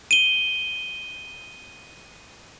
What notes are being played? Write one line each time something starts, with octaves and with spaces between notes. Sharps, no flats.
D#7 G7